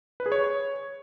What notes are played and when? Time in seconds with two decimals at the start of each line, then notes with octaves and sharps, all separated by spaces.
0.20 B4
0.26 G#4
0.32 C#5